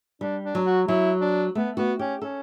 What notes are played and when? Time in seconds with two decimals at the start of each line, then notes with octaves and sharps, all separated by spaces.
0.21 G3 D4
0.44 D4
0.55 F#3
0.66 F#4
0.88 F#3 E4
1.21 D4
1.55 A3 B3
1.77 B3 F#4
1.99 C#4 G4
2.22 C#4 A4